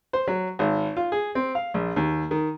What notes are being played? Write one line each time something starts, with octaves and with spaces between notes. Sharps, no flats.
C5
F#3
G#1
F4
G#4
C4
F5
A#1
D#2
D#3